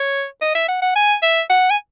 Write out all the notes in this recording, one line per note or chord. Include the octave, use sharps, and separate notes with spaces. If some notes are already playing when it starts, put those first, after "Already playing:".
Already playing: C#5
D#5
E5
F#5
F#5
G#5
E5
F#5
G#5